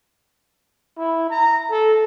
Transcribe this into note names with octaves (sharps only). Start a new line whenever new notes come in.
E4
A#5
A4